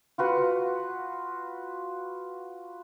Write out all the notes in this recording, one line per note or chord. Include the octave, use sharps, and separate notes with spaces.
F4 F#4 B4 F#5